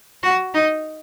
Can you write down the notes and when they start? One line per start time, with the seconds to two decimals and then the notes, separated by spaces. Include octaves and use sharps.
0.23 F#4
0.54 D#4